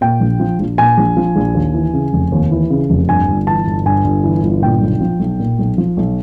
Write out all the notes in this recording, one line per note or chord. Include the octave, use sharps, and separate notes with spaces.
A#2 G5
A#1
F3
A#1
A#2 G#5
A#1
F3
A#1
D#2
E3
C#3
F1
D#2
E3
C#3
F1
G2 G#5
G1
E3 A5
G1
G2 G#5
G1
E3
G1
A#2 G5
B1
F3
B1
A#2
B1
F3
B1